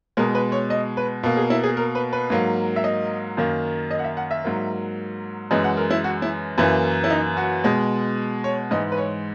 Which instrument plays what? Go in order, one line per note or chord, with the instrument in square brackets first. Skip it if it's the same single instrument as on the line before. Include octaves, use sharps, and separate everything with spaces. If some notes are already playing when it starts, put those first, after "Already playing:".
[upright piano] B2 G#3 A#4
B4
C#5
D#5
B4
B2 A#3
G#4
E4
G#4
A#4
B4
B4
G#2 F#3 A#3
E5
D#5
F#2 D#3 A#3
D#5
F#5
E5
F#5
E5
G#2 F#3 A#3
F#2 E3 G#3 D#5
F#5
A#4
E4
F#4
E4
F#2 E3 A#3 E4
E4
D#4
F#4
B2 G#3
C#5
G#2 E3 G#3 D#5
B4
C#5